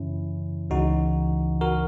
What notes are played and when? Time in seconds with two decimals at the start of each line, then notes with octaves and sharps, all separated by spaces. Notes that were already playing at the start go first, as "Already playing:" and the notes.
Already playing: F#2 C#3 E3 C#4 E4
0.70 C#2 C#3 E3 D#4 F#4
1.61 F#4 A#4